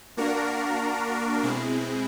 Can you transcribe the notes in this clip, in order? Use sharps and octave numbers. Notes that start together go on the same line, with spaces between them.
A#3 D4 F#4 A#4
B2 G#3 C4 E4 G#4